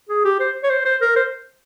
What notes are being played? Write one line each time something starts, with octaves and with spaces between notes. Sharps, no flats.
G#4
G4
C5
C#5
C5
C5
A#4
C5